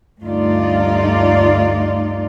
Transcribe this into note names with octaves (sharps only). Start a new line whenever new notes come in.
D2 G2 A3 D#4 F4 D5